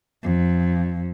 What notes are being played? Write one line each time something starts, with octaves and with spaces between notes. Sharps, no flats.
F2